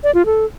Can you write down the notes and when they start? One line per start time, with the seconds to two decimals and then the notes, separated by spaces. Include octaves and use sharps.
0.04 D5
0.15 F4
0.26 A4